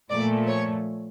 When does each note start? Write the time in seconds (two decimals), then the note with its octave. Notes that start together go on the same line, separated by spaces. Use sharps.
0.11 A#2 F3 A3 D5
0.48 C#5